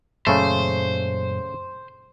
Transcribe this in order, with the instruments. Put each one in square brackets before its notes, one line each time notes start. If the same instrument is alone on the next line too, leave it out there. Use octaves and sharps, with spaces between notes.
[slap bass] F#2 A#2 F#3 [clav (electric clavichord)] C#3 A3 [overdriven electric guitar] C5